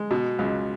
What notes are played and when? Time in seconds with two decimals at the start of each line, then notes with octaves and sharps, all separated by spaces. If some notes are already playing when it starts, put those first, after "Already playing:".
Already playing: G#3
0.11 B2
0.39 C#2